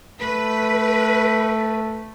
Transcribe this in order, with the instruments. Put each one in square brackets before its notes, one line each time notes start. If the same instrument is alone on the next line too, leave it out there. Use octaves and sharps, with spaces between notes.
[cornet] A3 [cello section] B4